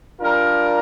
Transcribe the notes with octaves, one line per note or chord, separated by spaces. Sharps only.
G3 D4 F4 A#4